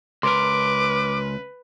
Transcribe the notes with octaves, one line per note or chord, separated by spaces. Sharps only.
C#2 A#4 B4 C6 D6